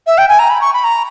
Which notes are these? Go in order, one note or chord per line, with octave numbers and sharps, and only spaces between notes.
E5
G5
G#5
A#5
B5
C#6
B5
A#5